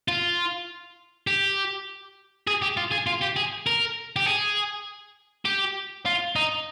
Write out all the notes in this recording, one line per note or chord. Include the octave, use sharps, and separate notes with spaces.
F4
G4
G#4
G4
F4
G#4
F4
G4
G#4
A#4
G4
G#4
G4
F4
D#4